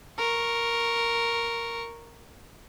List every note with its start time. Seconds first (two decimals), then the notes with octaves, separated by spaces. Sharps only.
0.18 A#4 C#6